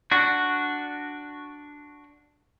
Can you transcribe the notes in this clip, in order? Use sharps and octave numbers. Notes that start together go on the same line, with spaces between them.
D4 F#4